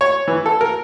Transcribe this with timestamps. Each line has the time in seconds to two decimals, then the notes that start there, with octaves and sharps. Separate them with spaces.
0.01 C#5
0.28 E3
0.46 A4
0.61 A#4